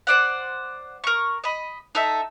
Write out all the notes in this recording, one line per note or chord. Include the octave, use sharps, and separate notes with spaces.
C5 D5 F#5
A#4 C#6
D#5 B5
D#4 A4 E5